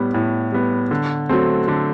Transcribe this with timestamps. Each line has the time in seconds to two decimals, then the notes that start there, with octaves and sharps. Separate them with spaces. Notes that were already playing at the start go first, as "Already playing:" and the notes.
Already playing: A2 G3 B3
0.14 A2
0.52 G3 B3
0.91 D3
1.29 F#3 A3 C4
1.68 D3